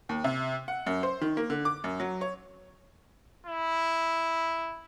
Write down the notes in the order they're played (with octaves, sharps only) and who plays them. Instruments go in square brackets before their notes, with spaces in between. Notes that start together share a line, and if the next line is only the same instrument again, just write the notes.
[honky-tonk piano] D#2
C3
F#5
F#2
C5
D#3
A#3
D3
D6
F#2
F#3
C#5
[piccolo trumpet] E4